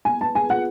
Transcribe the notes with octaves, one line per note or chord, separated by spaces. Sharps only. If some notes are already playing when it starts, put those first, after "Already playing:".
B3 G#5
B4 A5
G#4 G#5
F4 F#5